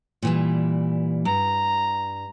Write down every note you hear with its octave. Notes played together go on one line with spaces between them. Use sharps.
A#2 E3 G3
G2 A#5